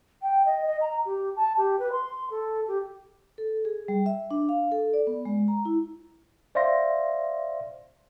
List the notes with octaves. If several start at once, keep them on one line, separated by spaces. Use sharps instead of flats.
G5
D#5
D#5
A#5
G4
A5
G4
B4
C6
A4
G4
A4
G#4
G3
E5
D4
F5
A4
D5
B3
G#3
A#5
E4
C5 D5 E5 F5 C6 A#6